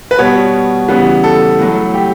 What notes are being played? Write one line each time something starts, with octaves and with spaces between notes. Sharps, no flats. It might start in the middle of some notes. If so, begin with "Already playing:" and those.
B4
B2 G3 B3 C#5
C#3 E3 G3 B3
A4
A2 F#3 A3
G4